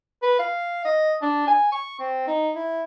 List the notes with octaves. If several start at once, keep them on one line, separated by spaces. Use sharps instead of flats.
B4
F5
D#5
D4
G#5
C#6
C4
D#4
E4